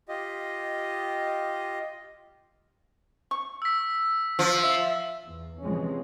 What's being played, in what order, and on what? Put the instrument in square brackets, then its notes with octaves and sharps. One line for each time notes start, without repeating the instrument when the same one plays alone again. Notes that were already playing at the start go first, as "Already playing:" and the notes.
[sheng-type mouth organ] F4 G4 D#5
[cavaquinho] C#6
[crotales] E6 B6
[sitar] F3
[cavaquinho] E5
[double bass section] E2
C3 E3 F3 G#3 C4 C#4